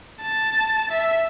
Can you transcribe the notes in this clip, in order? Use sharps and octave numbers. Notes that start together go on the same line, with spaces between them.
A5
E5